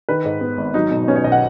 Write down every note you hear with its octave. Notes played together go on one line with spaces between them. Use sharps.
D#3 B4
G#2
B3
G#1
F#3 D#4
B2
B3 C#4
C#5
B1 D#5
F#5